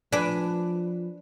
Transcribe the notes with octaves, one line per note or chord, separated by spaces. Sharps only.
F3 D4 B4 G#5